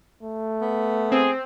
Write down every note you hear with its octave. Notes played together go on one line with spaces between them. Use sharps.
A3
B3
C4 G#4